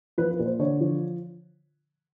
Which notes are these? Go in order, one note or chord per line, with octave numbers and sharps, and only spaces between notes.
F3 B4
B4
A#2
C5
D3 C#5
F3